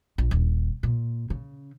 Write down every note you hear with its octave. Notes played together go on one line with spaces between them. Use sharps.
A#1
D#1
A#2
C#3